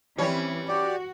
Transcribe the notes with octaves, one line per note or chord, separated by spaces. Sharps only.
E3 G3 C4 C#4 C#5
F#4 G4 D5